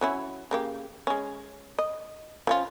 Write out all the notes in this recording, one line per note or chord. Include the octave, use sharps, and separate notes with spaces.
F#3 C#4 E4
C#3 A#3 G4
G#3 C#4
D#5
F3 C#4 F4